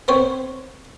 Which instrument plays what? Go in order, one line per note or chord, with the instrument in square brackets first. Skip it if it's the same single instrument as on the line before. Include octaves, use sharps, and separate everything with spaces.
[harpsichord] B3 C4 C5 C#5